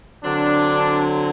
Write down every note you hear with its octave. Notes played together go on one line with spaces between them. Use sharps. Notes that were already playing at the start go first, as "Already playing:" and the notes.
D3 F#3 C4 D4